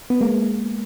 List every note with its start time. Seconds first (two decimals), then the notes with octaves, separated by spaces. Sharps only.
0.10 B3
0.21 G#3 A#3